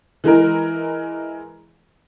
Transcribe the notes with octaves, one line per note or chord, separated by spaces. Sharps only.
E3 G#3 E4 A#4